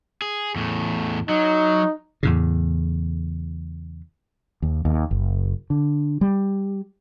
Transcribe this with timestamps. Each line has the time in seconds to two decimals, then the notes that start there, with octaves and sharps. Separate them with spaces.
0.22 G#4
0.56 E2 A2
1.29 F#3 D#4
2.23 E2 A2 C#3
4.62 D#2
4.85 D#2
5.11 F#1
5.70 D3
6.21 G3